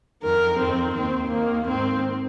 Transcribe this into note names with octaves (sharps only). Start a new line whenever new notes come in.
F2 D#3 A#4
F2 D#3 C4
D#2 D#3 C4
D#2 D#3 A#3
G#2 D#3 C4